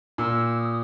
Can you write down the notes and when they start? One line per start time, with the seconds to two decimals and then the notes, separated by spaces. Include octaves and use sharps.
0.18 A#2 E6
0.60 D#6